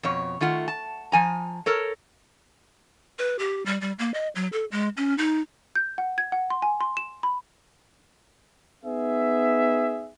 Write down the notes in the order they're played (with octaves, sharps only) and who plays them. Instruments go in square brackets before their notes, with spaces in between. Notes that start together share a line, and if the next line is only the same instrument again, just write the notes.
[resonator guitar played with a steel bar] F2 B2 C#5
D#3 A3 F4 F#5
A5
F3 G#5 A#5
A4 A#4 C#5
[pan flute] B4
G4
G3
G3
A#3
D#5
F#3
A4
G#3
C#4
D#4
[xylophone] G6
F#5
G#6
F#5
C6
G#5
C6
E7
B5
[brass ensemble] B3 D#4 G#4 E5